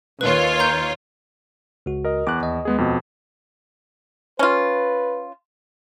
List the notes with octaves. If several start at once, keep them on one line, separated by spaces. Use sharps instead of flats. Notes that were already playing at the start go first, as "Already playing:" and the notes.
D#2 F4 B4 C#5
A#5 G6
C#2 F#4
A#4 D#5
E2 D6 F#6
D#2 D#5
G#3 B3 G#4
F2 B2
C#4 F4 B4